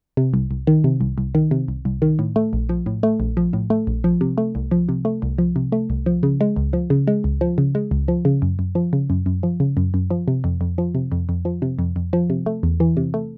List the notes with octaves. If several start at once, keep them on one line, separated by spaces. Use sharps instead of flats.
C3
C2
C2
D#3
C3
C2
C2
D#3
C3
C2
C2
D#3
A2
A3
A#1
F3
A2
A3
A#1
F3
A2
A3
A#1
F3
C3
A3
C2
F3
C3
A3
C2
F3
C3
A3
C2
F3
C#3
G#3
C#2
F3
C#3
G#3
C#2
F3
C#3
G#3
C#2
F3
C#3
F#2
F#2
F3
C#3
F#2
F#2
F3
C#3
F#2
F#2
F3
C3
F2
F2
F3
C3
F2
F2
F3
C3
F2
F2
F3
C3
A3
E2
E3
C3
A3